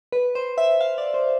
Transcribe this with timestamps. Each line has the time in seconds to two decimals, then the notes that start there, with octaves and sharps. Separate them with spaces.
0.12 B4
0.35 C5
0.58 E5
0.81 F5
0.98 D5
1.14 C5